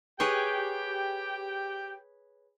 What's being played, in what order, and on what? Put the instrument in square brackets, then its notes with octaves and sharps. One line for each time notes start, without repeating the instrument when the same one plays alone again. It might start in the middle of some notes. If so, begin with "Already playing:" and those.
[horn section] G4 G5 [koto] G#4 B4 C#5